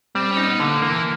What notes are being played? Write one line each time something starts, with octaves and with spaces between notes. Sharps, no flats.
G3 C4
C#4
D#4
B3
D3 A#3
E3 A#3